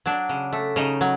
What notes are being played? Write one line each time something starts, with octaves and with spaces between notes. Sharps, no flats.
F#3 D4
C#3
A3
C#3 D#4
F#3